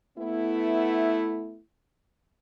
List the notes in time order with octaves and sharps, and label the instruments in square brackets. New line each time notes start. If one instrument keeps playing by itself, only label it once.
[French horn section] A3 B3 E4